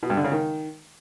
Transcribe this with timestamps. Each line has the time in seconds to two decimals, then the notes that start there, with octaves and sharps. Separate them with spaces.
0.03 B2
0.10 G2
0.17 D3
0.24 C#3
0.32 D#3